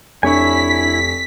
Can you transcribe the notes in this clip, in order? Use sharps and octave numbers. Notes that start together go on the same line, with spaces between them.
F1 D4 E4 C#5 G#5 C#6 B6